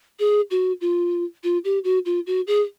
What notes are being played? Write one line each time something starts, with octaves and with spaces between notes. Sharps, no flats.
G#4
F#4
F4
F4
G4
F#4
F4
F#4
G#4